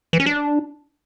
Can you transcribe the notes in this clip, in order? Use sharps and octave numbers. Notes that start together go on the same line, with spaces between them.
E3
C#4
D4